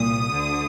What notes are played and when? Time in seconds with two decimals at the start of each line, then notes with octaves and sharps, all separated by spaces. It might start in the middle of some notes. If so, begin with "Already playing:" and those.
Already playing: C2 A#2 D#6
0.32 D2 D3